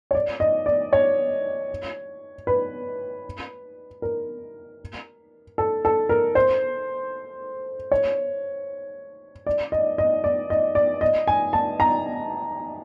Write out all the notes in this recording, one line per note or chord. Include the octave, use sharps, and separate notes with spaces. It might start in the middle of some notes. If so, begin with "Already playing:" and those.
C#5
D5
D#5
D5
C#5
B4
A#4
A4
A4
A#4
C5
C#5
D5
D#5
D#5
D5
D#5
D5
D#5
G#5
A5
A#5